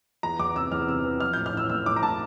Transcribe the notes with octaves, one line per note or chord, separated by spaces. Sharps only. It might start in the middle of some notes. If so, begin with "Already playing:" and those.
E2 A#5
E2 D6
C3 E6
E2 F6
C3 E6
E3
F3 F6
G6
A2
F6
A1 E6
A2 E6
A2 D6
A#5
A2 A5